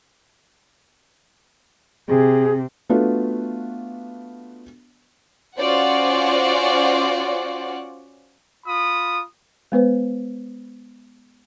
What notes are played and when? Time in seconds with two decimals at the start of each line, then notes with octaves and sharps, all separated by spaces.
2.08 C3 G#4
2.90 A3 B3 D4 F4 F#4 B4
5.57 C#4 F4 F#4 C5 D5 F#5
8.66 F4 B5 D#6
9.72 G#3 B3 B4 C5